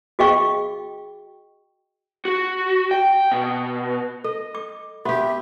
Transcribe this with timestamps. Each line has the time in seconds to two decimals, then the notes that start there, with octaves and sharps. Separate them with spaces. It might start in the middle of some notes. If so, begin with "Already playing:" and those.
0.19 F#4 G#4 D#5 F5 G5 C#6
2.25 F#4
2.91 G5
3.32 B2
4.24 A4 D#5
4.55 D6
5.05 B3 F#4 G4 E5